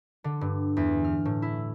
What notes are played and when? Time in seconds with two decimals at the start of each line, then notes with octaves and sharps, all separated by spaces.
0.24 D3
0.41 G2
0.77 E2
1.04 F6
1.25 A2
1.42 E4